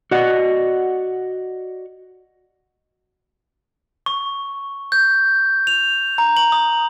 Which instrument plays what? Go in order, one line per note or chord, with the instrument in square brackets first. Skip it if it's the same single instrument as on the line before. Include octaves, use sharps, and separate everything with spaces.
[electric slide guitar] F#4 D5 D#5 F#5
[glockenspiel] C#6
G6
F7
A#5
F#7
D#6